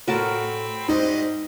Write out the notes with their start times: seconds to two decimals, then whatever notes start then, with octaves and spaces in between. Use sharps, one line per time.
0.08 A2 C4 F#4 A#4 A5 B5
0.88 G#2 F#3 G3 D#4 C5 D#5